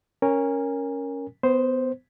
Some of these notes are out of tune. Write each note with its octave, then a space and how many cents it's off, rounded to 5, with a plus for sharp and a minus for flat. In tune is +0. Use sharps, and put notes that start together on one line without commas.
C#4 +0 A#4 +0 G#5 -30
B3 +25 C5 +0